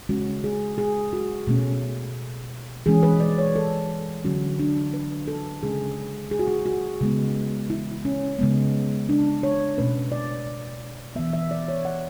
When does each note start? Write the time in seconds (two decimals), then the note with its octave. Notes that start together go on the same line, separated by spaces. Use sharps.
0.09 C#3 G#3 C#4 F#4
0.44 G#4
0.78 G#4
1.13 F#4
1.47 B2 A3 C#4
2.86 E3 G#3 C#4 G#4
3.03 B4
3.20 D5
3.38 C#5
3.56 A4
4.24 D3 F#3 C#4 F#4
4.59 D4
4.94 B4
5.28 A4
5.63 C#3 G#3 C#4 G#4
6.31 G#4
6.39 F#4
6.48 G#4
6.66 F#4
7.01 C#3 G#3 B3
7.70 E4
8.05 C#4
8.39 C#3 G#3 B3
9.09 D4
9.43 C#5
9.78 B2 A3 C#4 B4
10.12 D5
11.16 E3 B3 E5
11.33 E5
11.51 D5
11.68 C#5
11.85 F#5